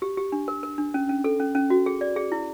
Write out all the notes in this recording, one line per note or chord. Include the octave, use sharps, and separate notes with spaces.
G4
G4
D4
A#4
A#4
D4
C#4
C#4
A4
C#4
C#4
F#4
G#4
D5
G#4
E4